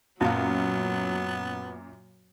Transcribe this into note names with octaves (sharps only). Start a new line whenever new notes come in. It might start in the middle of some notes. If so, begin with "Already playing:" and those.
F#2 A#2 F#3 B3 C#4 F5